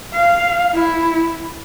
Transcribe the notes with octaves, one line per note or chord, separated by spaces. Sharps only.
F5
E4